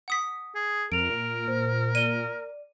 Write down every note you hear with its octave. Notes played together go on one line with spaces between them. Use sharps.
F#5 D#6 B6
G#4
F2 A#4 D7 F7
A#2
A#2 C5
D5 D#7 G7